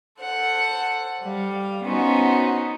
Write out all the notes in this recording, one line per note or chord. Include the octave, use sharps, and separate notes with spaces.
A4 C5 F#5
G3 F5
B3 C#4 D#4 F#4 C5